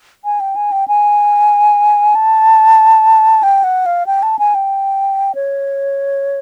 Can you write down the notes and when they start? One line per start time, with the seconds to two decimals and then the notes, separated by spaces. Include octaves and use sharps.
0.25 G#5
0.40 G5
0.56 G#5
0.72 G5
0.88 G#5
2.15 A5
3.43 G5
3.64 F#5
3.86 F5
4.07 G5
4.23 A5
4.39 G#5
4.55 G5
5.35 C#5